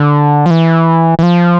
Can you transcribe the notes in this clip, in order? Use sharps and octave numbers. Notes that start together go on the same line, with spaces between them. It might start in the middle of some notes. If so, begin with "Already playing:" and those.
Already playing: D3
F3
E3
E3
F3